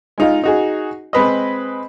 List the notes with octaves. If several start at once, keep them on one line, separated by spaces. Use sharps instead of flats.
G#3 D#4 F4
D#4 F#4 G#4
G#3 C4 B4 D#5